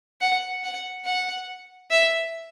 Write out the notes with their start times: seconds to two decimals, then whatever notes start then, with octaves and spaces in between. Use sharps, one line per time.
0.21 F#5
0.64 F#5
1.05 F#5
1.91 E5